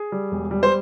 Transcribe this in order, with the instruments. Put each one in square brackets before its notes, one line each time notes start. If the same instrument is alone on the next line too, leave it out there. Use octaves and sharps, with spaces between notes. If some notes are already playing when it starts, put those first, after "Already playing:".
Already playing: [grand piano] G#4
G3
E1
G3
C5